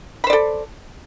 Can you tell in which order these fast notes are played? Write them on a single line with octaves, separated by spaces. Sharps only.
B5 C5 D5 A4